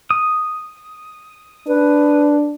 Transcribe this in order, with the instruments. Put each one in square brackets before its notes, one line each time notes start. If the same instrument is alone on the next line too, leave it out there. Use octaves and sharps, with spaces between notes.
[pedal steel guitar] D#6
[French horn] D4 [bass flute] B4